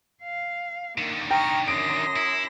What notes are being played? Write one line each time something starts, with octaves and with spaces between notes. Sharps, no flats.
F5
D3 D#3 A#3
G5 A#5 C#6 D#6 F6
F#2 C6 D#6 A#6 D7
E4